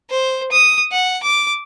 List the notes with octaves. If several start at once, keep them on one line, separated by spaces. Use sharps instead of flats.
C5
D#6
F#5
D6